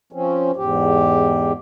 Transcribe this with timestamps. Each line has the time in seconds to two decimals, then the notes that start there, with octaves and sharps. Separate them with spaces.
0.12 F3 C4 C#4
0.56 E2 G#2 G4